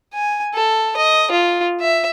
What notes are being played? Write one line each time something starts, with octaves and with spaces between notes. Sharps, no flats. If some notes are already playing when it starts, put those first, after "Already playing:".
G#5
A4
D#5
F4
E5